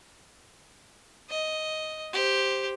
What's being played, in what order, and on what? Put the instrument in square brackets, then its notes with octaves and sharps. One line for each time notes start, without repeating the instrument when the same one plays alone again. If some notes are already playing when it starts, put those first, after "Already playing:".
[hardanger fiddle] D#5
G4 C5